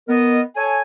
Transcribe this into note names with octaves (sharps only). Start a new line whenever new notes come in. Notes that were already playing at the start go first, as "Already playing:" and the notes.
B3 A#4 D#5
A4 C#5 G#5